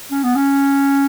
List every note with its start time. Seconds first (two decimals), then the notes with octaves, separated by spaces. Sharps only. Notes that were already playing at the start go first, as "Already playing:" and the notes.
0.11 C#4
0.24 B3
0.35 C#4